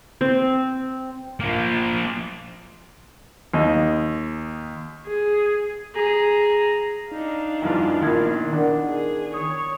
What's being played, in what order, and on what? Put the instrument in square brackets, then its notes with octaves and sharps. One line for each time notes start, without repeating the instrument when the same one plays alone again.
[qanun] C4
[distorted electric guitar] F3 A#3
[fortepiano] D#2 D#5
[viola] G#4
[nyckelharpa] G#4 A#5
[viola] D4 F5 [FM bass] D#4
[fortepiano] E2 G2 F3 [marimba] E4
[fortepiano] A#1 [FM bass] D#3 [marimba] B3 F4 G#6
[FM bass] D#3 [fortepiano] D4 [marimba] A#4 D5 F#5
[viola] G#4
[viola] C#5 [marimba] D#6